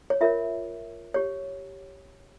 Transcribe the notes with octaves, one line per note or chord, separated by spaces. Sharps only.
C#5
F4 A#4 C#5 E5
G4 C#5